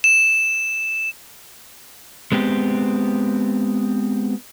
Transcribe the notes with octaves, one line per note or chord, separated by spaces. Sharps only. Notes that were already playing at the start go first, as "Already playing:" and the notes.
E7
G#3 B3 C4 G4